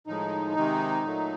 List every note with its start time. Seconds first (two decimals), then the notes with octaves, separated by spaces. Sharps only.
0.07 A2 D#3 F3 G#3 D#4
0.56 C3 D#3 G#3
1.04 A#2 F#3 A3